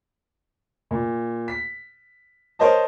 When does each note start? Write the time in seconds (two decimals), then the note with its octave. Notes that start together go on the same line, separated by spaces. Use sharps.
0.91 A#2
1.48 B6
2.59 A#4 C5 C#5 D#5 A5